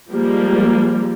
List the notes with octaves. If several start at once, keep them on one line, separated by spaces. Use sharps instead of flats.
F3 G3 G#3 A#3